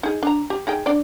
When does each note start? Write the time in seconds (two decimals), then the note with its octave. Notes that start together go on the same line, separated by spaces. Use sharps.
0.03 D#4 G#4
0.23 D4 A#5
0.50 G4
0.67 D#4 G#4 G5
0.86 D4 D5